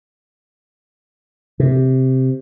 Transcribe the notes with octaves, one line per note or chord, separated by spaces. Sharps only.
C3